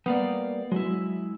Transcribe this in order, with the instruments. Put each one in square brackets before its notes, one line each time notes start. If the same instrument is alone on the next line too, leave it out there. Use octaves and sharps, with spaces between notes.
[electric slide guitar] G3 A#3 D5 [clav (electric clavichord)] B3
[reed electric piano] F#3 [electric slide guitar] G#3 E4